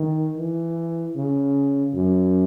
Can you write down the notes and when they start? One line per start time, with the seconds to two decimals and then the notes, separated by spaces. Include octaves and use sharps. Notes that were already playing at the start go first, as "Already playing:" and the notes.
Already playing: D#3
0.38 E3
1.16 C#3
1.94 F#2